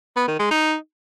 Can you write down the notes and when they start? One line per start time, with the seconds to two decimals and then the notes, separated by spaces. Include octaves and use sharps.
0.16 B3
0.28 D#3
0.39 G#3
0.51 D#4